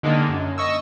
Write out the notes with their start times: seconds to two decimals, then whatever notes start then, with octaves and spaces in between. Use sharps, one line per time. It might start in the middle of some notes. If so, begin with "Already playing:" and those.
0.03 D3 D#3 G#3 A#3 D4
0.29 F#2
0.58 D#5 C#6 E6